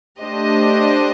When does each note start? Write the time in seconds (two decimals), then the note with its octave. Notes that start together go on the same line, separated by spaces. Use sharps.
0.21 A3 D4 G4 C5 D#5